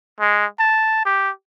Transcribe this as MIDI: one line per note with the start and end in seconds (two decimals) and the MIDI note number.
0.20 0.46 56
0.59 1.02 81
1.06 1.30 67